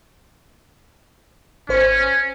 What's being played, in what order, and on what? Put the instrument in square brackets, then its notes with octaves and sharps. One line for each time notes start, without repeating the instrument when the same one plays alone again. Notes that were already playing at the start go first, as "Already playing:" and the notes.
[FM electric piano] G#1 C5 [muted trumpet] C#4